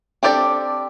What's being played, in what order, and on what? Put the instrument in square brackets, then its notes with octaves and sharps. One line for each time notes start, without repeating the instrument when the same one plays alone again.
[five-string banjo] C4 D4 G4 A4 D5